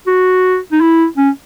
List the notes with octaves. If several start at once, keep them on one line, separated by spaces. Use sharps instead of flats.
F#4
D#4
E4
C#4